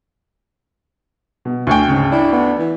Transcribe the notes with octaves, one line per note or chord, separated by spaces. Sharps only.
B2
D2 G5 G#5 C#6
G#2 C#3
D4 E4
B3
E3